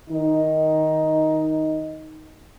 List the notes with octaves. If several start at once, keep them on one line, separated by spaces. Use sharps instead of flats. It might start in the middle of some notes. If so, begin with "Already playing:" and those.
D#3 D#4